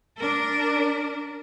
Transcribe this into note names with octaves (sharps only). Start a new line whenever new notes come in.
D4 A#4